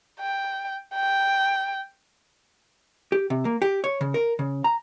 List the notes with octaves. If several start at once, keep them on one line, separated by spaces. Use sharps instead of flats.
G5
G5
G4
C3
A#3
G4
C#5
C#3
A#4
C#3
A#5